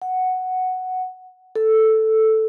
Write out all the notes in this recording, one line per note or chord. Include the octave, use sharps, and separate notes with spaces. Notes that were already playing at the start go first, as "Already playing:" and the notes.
F#5
A4